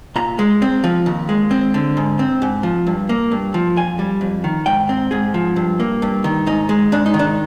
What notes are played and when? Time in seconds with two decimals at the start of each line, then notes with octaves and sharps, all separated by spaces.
0.16 A#2 A#5
0.39 G#3
0.62 C4
0.84 F3
1.06 D#2
1.29 G#3
1.51 C4
1.74 D3
1.97 G#2
2.19 C4
2.42 G#2
2.63 F3
2.87 G2
3.09 A#3
3.32 G2
3.54 F3
3.76 F2 G#5
3.99 G3
4.21 F2
4.44 D#3
4.66 G#2 G5
4.89 C4
5.11 G#2 G#4
5.34 F3
5.56 G2
5.80 A#3
6.02 G2
6.24 D#3
6.46 G#2 D#4
6.69 G#3
6.92 G#2 D4
7.06 D#4
7.14 D#3
7.19 D4